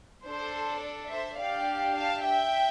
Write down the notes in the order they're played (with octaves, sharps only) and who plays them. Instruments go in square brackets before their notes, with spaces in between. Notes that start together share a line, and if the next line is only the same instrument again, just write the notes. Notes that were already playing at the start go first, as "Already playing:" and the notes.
[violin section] D4 A4 C5
D5
C5 E5
D4 G4 D5 F5
F5 A5
E5 G5